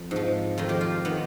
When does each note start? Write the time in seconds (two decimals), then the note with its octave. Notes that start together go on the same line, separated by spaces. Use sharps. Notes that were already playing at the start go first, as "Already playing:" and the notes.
Already playing: F2
0.11 G#2 F3
0.58 F2 D#3 F4
0.69 G4
0.81 F4
1.05 D#3 B3